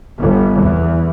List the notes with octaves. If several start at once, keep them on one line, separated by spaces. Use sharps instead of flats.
G1
E2